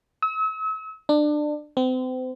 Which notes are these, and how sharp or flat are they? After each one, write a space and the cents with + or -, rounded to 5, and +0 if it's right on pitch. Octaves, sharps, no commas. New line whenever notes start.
E6 -40
D4 +25
C4 -35